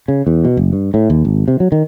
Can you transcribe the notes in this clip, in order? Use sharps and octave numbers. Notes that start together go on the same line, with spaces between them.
C#3
E2
B2
F#1
G2
A2
D#2
G#1
C3
F#3
D#3